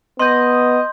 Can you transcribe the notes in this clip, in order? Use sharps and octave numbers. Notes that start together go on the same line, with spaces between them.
B3 D#5 C6 G6